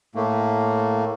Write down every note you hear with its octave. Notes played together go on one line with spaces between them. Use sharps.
A2 A3 A#3